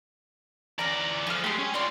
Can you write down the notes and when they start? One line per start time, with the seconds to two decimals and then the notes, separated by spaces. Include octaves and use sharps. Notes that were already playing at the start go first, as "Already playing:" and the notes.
0.79 E3 C#4 D5 A#5
1.27 D3 F3 G#4 F6
1.44 G#3 A3 G4 C6
1.59 C#4 G#5
1.74 F4 C#5 D5 C6